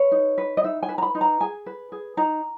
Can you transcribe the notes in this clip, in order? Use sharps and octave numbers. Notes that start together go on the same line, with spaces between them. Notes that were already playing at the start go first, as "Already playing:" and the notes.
Already playing: B4 C#5
D#4
B4
D#5
D#4 E5
G#5
B4
A#5
B5
D#4
A#5
G#4 G#5
B4
G#4
D#4 A#5